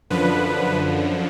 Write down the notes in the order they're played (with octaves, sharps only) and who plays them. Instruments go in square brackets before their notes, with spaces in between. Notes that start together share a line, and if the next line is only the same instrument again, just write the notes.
[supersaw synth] F#2 D3 F3 B4